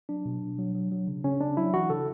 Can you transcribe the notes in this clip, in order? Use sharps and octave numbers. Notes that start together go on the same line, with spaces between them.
F#3 D4
B2
B2
F#3
F#3
F#3
C#3
C#3 C#4
C#3 D4
F#3 E4
E3 F#4
C#3 A4